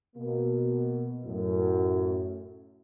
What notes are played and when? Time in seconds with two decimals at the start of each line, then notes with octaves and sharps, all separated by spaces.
0.16 B2 A#3
1.25 F#2 A2